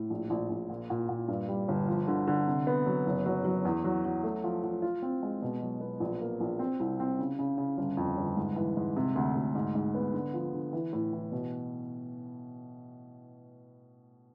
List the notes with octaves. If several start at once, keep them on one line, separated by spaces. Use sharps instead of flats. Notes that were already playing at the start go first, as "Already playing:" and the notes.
Already playing: A2
A#1
A#1
A#1
A#2
A#2
A#2
G2
G3
G1
F3
D3
D3
C3
B3
F#3
F#1
F#3
F#3
E2
F#3
F#3
A3
F3
F3
F4
C4
G#3
B2
F#3
B3
A#1
A#3
A#1
C4
C2
C4
C#3
C#3
C#3
G1
F2
G1
G#2
E3
G#2
C3
D2
D2
G#2
G#2
B3
D3
F3
D3
E3
A2
E3
B2